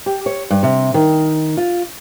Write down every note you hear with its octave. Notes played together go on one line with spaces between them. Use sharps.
G4
C#5
G2
C3
D#3
F4